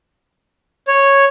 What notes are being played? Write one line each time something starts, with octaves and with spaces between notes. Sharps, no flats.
C#5